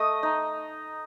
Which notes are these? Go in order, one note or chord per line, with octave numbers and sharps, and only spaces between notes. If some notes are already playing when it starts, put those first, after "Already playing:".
Already playing: A3 D#5 D#6
D#4